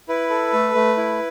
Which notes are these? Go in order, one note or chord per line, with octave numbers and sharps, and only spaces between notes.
E4 B4
A4
A3
A3
E4